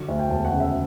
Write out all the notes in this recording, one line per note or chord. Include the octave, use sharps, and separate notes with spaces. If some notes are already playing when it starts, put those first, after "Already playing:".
Already playing: D3 F#3
D2
G5
E1 A5
F#5
C#3
E5